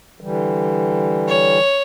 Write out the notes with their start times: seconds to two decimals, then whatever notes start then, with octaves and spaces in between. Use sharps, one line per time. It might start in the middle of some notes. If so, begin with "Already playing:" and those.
0.21 D3 E3 G3
1.28 C#5